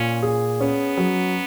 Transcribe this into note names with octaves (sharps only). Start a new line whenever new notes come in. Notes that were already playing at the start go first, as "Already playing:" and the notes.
Already playing: A#2 C#4
G#4
B3 C#4
F#3